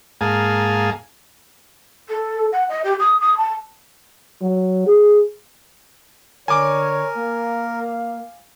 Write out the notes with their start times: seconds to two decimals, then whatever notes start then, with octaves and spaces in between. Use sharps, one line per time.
0.21 G#2 A#3 G#4 F5 G#5 A5
2.08 A4
2.52 F#5
2.68 D#5
2.83 G4
2.99 D#6
3.20 D#6
3.37 A5
4.41 F#3
4.86 G#4
6.48 D3 A#4 C#5 G#5 D6
7.15 A#3 F5